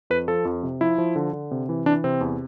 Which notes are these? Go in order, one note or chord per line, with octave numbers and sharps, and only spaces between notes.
F2 B4
F3 A4
F2
C3
F3 E4
F3
D3
D3
C3
E3
E3 D4
C3 C4
E2